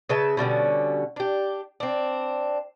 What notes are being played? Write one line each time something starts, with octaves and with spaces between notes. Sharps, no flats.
C#3 B4 E5 A5
B2 D3 G3 C#4
D4 G4
C4 D4